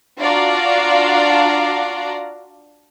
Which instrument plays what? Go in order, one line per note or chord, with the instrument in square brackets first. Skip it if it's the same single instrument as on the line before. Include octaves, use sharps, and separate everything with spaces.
[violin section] D4 F4 F#4 D5 F5 A#5